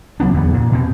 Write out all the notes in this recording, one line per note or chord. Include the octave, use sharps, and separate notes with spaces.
C2 F#3 B3 D4
E2 D3 B3
A#2
B2 C4